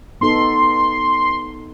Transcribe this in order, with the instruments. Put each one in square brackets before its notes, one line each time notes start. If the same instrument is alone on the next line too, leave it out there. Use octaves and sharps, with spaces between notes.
[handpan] B3 D#4 A4 [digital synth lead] C6